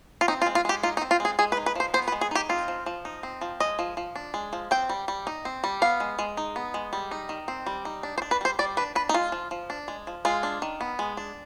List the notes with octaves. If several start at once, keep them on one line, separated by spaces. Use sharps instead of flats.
F4
C4 D#4
F4
G#3
F4
G#3 G4
D#4 F4
D#4
C4
F4
G#3 G#4
G#3 G#4
B4
D#4
B4
F3 C5
B3 C5
B4
G#3
G#4
D#4 G4
C4 F4
F3
F3
D#4
C4
F3
G#3 D#5
F3
F3
D4
G#3
F3
C4 G5
G3
G3
D#4
C4
G3
B3 F5
G#3
G#3
D#4
B3
G#3
G3
D#4
D#3
C4
G3
D#4
D4
C5
D4
B4
G3 C5
G3 D5
D4 B4
D4 B4
D#4
G#3 F4
F3
F3
D4
G#3
F3
G#3 F4
D4
D#3
B3
G#3
D4